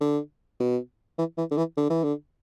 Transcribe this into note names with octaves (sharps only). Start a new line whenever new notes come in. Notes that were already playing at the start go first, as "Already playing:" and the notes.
D3
B2
E3
E3
D3
E3
D3
E3
D3